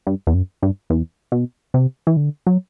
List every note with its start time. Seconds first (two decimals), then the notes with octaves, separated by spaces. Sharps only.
0.07 G2
0.27 E2
0.34 F#2
0.62 G2
0.90 E2
1.32 B2
1.74 C3
2.07 E3
2.17 D3
2.47 F#3